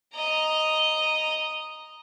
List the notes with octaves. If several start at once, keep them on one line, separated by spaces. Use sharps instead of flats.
D#5 A#5